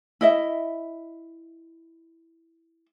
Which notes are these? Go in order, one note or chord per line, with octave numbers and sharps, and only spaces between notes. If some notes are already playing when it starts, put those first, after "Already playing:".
E4 D#5 E5